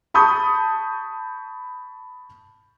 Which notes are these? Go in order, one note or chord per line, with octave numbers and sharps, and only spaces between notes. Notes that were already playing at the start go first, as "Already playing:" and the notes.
A5 B5 C#6 D#6 G6